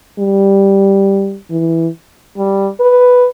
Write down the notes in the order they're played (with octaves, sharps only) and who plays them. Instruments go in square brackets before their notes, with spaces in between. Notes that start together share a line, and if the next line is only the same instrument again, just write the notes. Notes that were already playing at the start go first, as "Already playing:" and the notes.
[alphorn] G3
E3
G3
B4